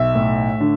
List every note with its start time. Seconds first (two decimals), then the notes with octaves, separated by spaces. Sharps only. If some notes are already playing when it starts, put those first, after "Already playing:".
Already playing: B1 E5
0.15 A2
0.60 D3